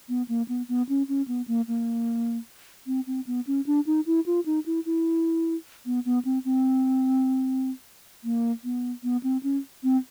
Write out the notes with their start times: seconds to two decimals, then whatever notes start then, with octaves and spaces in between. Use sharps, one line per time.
0.09 B3
0.28 A#3
0.48 B3
0.69 B3
0.89 C#4
1.08 C#4
1.28 B3
1.48 A#3
1.68 A#3
2.87 C4
3.07 C4
3.27 B3
3.47 C#4
3.67 D4
3.87 D#4
4.06 E4
4.26 F4
4.46 D#4
4.66 E4
4.86 E4
5.86 B3
6.05 B3
6.25 C4
6.45 C4
8.24 A#3
8.64 B3
9.03 B3
9.23 C4
9.43 C#4
9.83 C4